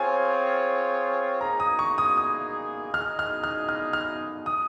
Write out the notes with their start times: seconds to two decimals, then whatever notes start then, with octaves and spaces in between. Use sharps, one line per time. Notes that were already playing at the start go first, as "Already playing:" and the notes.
Already playing: C4 F4 G#4 C#5 G#5
1.41 A#3 D#4 G#4 A#5
1.60 D#6
1.79 C#6
1.98 D#6
2.17 D#6
2.94 D#4 G#4 D#5 F6
3.19 F6
3.44 F6
3.69 F6
3.93 F6
4.46 D#6